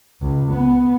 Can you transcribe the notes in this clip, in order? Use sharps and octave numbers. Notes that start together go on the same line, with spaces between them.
C#2
B3